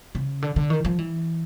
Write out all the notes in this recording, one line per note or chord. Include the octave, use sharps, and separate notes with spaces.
C#3
D3
D3
D#3
F3
E3